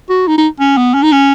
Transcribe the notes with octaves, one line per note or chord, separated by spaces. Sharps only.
F#4
D#4
D#4
C#4
B3
C#4
D#4
C#4